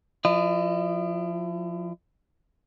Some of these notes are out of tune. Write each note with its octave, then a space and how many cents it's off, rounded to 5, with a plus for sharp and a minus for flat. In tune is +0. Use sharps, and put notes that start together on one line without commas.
F3 +15 E4 +40 D#5 -25